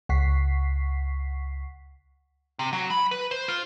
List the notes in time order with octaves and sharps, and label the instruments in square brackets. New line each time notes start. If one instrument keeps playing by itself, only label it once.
[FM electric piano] C#2 F#5 C#6 B6 C7
[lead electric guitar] C3
F#3
B5
B4
C5
F4